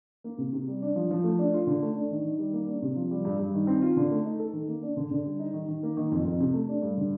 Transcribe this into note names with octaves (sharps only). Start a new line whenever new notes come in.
A#3
C3
C3
G3
D4
F3
F3
A3
D4
F4
D3
A3
D4
D#3
D#3
G3
A#3
D4
C3
F3
G3
G2
G2
D#3
C4
F4
D3
A3
D#4
A4
D#3
A#3
D4
D3
D3
G3
D#4
D#3
D#3
A#3
D#3
F2
F2
C3
A3
D4
G2
D3